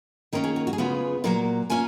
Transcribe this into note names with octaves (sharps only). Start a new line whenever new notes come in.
D#3 A#3 C#4 F4 A#4
G#4
F#4
F#4
G#4
C#3 G#3 B3 F4 F#4
A#2 F#3 A#3 A#4
A#3 C#4 F4 G#5